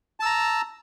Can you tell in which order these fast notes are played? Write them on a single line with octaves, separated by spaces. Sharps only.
A5 E6 A#5